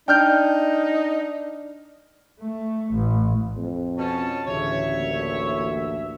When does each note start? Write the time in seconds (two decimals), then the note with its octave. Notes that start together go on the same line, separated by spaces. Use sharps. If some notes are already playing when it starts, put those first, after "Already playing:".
0.08 D4 D#4 G5 F6 G6
2.41 A3
2.94 A1
3.56 F2
3.98 B2 C#4 A5
4.47 A1 D2 C#3 C#5 E5
5.00 A#3